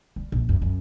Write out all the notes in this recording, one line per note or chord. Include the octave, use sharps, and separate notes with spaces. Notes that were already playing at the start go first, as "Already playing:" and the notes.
G3
A#1
F#2
F#2